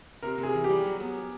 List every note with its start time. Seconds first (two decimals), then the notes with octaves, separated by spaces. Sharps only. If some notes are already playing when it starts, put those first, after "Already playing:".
0.23 C3 A#4
0.38 C3
0.43 G#4
0.54 E3
0.64 G4
0.69 G3
0.85 F#3
1.00 B3